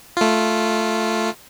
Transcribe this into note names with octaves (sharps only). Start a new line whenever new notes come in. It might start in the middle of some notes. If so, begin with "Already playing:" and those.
A3 F4